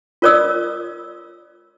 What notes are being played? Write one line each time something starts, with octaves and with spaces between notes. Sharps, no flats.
F4 A#4 C#5 D5 D#6 E6